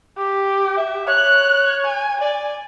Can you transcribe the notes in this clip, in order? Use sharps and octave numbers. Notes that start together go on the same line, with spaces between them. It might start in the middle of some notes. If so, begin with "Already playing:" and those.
G4
E5
C#5 F#6
G#5
D5 G#5